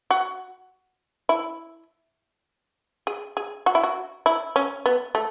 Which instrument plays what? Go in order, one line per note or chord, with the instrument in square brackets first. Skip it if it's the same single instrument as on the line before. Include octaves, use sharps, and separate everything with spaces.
[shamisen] F#4
E4
G#4
G#4
F#4
E4
F#4
E4
C#4
B3
A3